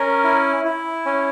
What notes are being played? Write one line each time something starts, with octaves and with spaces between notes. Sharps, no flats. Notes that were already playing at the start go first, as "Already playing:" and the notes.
Already playing: C#4 A#4
E4
E4
C#4